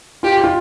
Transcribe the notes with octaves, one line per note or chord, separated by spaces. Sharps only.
F4 G4
F4